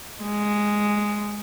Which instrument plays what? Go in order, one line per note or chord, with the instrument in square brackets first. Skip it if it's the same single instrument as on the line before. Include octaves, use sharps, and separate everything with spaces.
[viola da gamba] G#3